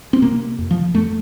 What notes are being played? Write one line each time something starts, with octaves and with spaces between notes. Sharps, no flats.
C4
C3 A#3
F2
F3
F2 A3